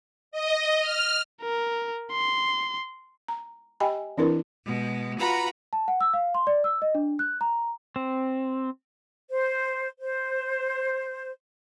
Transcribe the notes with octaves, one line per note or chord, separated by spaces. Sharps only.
D#5
F6
A#4
C6
A#5
G4 D#5 G5 G#5 B5
E3 C4 D4 E4 A#4 B4
B2 G#3
F4 F#4 B4 A#5 B5
A5
F#5
E6
F5
C6
D5
E6
D#5
D4
F#6
A#5
C4
C5
C5